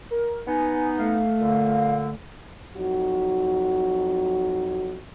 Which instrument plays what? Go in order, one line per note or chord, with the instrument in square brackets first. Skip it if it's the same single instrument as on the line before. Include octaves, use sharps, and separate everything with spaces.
[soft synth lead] A#4
[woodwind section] B3 D#4 [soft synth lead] G#5
[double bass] A3 [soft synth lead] F5
[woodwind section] A#2 D3
[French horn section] F2 F#3 D#4 F#4